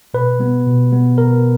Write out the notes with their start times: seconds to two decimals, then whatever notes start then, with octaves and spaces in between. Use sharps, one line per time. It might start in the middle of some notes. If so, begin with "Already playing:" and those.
0.14 B2 B4
0.40 G3 B3
0.66 B2
0.92 G3 B3
1.18 B2 A#4